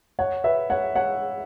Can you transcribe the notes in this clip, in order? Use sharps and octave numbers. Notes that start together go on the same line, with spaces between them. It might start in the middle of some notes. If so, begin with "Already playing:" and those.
C#5 F#5
B4 E5
C#5 F#5
C#5 F#5